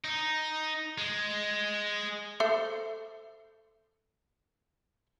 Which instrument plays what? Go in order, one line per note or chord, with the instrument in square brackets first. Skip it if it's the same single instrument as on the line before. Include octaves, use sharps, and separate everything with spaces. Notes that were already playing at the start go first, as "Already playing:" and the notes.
[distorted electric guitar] D#4
G#3
[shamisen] A4 C5 E5